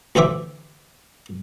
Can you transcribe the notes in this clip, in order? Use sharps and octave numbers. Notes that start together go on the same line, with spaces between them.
D2 E3 C5 E5 D6